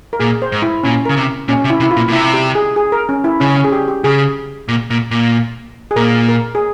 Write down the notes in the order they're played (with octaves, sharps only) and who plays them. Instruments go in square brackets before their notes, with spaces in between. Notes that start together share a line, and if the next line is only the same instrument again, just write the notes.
[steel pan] A#4
[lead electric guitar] A#2 [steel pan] G#4
[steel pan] C5
[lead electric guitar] G#2
[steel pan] E4
[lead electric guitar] A#2 [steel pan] C#4
[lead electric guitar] C#3 [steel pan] A#4
[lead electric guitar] C3
[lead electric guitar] A#2 [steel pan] C#4
[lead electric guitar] C3
[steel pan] E4
[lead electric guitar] C3
[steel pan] E4
F4
[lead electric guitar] A#2
A#2
[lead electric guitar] C3 [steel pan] E4
[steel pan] G4
G#4
G#4
A#4
C#4
E4
[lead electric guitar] C#3 [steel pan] C#4
[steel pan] C#4
G#4
G4
G4
[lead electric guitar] C#3 [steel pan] G#4
[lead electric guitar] A#2
A#2
A#2
[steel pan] G#4
[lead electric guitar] A#2 [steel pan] A#4
[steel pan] A#4
G#4